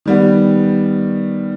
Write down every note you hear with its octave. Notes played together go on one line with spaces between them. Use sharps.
D#3 G3 B3